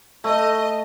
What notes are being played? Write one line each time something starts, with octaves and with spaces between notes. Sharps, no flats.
A3 D#5